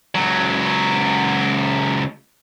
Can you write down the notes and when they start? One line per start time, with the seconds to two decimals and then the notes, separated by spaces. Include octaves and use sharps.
0.15 C#2 F#3